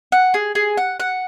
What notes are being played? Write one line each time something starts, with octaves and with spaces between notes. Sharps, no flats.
F#5
G#4
G#4
F#5
F#5